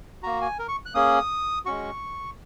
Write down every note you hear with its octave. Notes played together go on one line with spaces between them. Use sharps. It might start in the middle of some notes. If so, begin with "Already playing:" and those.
A#3 F#4 A#5
G#5
A#4
C#6
F#6
A#3 C#4 G#4 D#6
G#3 C#4 F#4 C#6